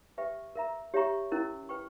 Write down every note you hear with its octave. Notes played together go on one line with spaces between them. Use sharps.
G4 B4 E5 G5 C#6
A#4 E5 A#5
G4 C#5 E5 A#5 C#6
C#4 E4 A#4
B4 G5 C#6